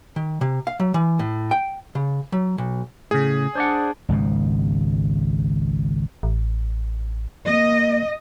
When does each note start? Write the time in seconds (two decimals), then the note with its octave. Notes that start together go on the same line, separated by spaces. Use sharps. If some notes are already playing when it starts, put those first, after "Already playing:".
0.16 D#3
0.41 C3
0.67 F5
0.80 F#3
0.94 E3
1.19 A2
1.51 G5
1.95 C#3
2.32 F#3
2.58 B1
3.11 A2 C#3 G#4
3.55 D4 C5 D5 F#5
4.09 G#1 C#2 G#2 B2
6.23 A1
7.47 A#3 D#5